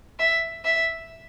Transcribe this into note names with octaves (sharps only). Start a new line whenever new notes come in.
E5
E5